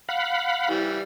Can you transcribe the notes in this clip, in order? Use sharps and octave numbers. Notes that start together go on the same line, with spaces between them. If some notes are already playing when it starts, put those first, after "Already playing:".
F5 F#5 B5
E3 G3